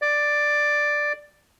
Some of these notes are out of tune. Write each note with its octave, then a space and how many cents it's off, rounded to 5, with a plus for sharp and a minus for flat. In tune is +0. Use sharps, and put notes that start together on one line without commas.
D5 +5